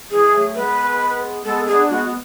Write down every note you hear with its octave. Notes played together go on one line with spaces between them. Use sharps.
E3 G#3 G#4
F#3 A3
G#3 B3 B4
G#3 B3 A4
B3 D4 G#4
G#3 B3 F#4
G#3